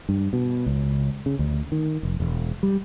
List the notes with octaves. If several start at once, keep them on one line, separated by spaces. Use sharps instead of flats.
G2
B2
C#2
C#3
D2
D#3
F1
E1
G3